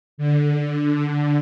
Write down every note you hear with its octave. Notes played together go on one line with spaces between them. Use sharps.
D3